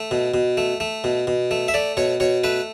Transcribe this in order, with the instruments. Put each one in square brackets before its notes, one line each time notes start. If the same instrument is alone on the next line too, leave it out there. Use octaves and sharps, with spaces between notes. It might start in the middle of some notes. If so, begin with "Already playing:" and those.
Already playing: [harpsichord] A3
B2
B2
A3
A3
B2
B2
A3
E5
A3 D5
B2 C#5
B2 C#5
A3 B4